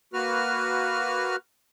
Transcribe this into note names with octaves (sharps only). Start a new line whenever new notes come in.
A#3 F#4 B4 F6